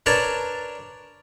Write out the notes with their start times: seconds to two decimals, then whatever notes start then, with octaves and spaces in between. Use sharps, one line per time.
0.06 D4 A#4 B4 C#5 A5 A#5